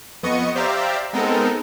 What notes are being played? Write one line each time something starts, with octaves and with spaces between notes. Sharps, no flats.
F2 B3 D#5 C#6 D#6 C#7
G4 C5 D5 E5 F5 A#5
G#3 B3 C4 D#4 A4 A#4